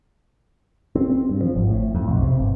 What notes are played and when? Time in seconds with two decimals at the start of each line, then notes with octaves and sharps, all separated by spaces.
0.95 C4
1.10 C4
1.29 G2
1.42 F3
1.56 G#1
1.70 A2
1.95 F2
2.07 B1
2.22 C3
2.38 G1